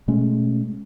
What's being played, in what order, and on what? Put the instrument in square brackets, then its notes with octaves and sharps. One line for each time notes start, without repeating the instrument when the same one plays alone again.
[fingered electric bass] B2 G#3 A3 C#4